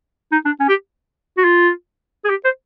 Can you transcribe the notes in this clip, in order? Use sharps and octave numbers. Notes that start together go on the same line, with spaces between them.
D#4
D4
C#4
G4
F#4
F4
G#4
G4
C5